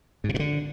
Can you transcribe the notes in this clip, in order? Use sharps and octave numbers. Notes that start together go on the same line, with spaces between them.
G#2
C3
A#2
D3